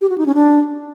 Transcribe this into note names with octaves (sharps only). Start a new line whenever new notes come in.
G4
F#4
D#4
C#4
D4